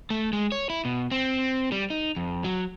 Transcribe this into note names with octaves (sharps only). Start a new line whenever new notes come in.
A3
G#3
C#5
E4
B2
C4
G3
D#4
F2
F#3